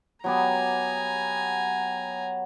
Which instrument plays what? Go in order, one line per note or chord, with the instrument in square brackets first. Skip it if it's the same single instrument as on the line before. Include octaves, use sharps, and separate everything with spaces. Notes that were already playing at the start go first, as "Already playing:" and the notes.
[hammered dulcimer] F#3 B3 G4 [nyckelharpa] G#5 A#5